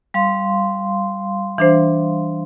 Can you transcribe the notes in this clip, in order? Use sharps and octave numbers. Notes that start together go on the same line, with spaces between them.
G3 F5 C6
E3 D4 C5